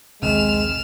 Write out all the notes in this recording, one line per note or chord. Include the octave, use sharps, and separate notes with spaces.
A#1 D#2 C3 G#3 F6 E7